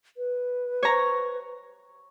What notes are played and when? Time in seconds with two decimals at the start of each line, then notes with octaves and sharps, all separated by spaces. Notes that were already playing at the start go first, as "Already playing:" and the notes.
0.17 B4
0.83 C#5 A#5